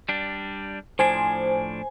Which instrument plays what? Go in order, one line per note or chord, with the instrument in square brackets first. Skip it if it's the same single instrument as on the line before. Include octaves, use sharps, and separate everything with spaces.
[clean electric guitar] G3 D4
[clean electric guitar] A2 F3 D4 [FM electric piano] C5 G#5